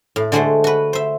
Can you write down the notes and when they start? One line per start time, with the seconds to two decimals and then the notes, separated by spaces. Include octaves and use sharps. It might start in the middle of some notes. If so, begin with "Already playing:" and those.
0.16 A2
0.32 D3 G#3 A3 F#4 C5
0.64 F#4 B4
0.93 C5 E5